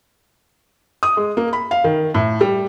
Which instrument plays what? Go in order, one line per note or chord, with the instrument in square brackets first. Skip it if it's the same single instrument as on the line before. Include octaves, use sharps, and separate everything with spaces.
[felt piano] D#6
G#3
A#3
B5
F5
D#3
A2
G3